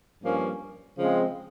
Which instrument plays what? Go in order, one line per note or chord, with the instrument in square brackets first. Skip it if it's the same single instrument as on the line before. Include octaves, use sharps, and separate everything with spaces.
[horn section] G2 F3 A#3 C#4
C#3 F3 G#3 C4